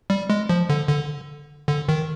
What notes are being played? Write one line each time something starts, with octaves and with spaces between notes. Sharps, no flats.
G3
G#3
F3
D3
D3
D3
D#3